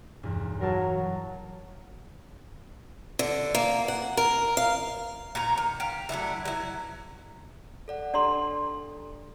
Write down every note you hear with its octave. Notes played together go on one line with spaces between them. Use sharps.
B1 E2 G2
F#3 A#4 F5 A5
D3
A#3
F#5
A#4
F5
A#2 C#5 A#5
D#3
G4 F5
F#3 A3 D4 E4
F#3 E4
A4 D5 F#5
D4 G4 A4 D5 A#5 C6